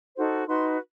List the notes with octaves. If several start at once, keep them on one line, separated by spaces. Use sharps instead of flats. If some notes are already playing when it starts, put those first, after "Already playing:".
D#4 F#4 A4 C5
D#4 F#4 B4 C6